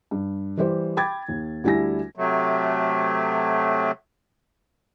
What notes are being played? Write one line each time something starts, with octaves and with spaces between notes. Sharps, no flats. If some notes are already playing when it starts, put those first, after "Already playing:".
G2
E3 G3 G4 C5
G5 B5 D6 G#6 A6
D#2
D2 G3 E4 G#5 A#6
C3 F#3 A3